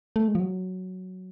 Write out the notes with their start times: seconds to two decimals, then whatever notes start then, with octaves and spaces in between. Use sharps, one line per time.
0.16 A3
0.28 G#3
0.35 F3
0.40 F#3